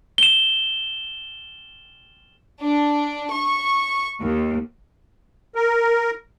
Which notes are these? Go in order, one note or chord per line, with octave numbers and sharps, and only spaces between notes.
E7 G7
D4
C#6
D#2
A#4